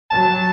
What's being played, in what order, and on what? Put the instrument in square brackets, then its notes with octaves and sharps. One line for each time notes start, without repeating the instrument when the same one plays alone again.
[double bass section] F#3 [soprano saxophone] A5